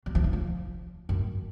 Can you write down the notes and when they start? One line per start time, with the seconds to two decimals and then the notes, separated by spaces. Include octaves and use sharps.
0.06 F#3
0.15 F3
0.24 D#3
0.33 F3
1.09 F#2